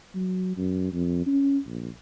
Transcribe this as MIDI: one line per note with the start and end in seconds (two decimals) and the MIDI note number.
0.15 0.56 54
0.57 0.91 42
0.93 1.26 41
1.27 1.58 61
1.67 1.89 34